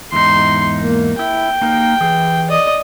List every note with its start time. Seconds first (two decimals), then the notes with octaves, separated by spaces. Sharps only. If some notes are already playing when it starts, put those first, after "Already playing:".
0.13 E2 G#2 D#4 C6
0.81 A#3
1.19 E4 G5
1.61 A#3 D#4 A#4
2.01 E3 G#4
2.48 D5 D#5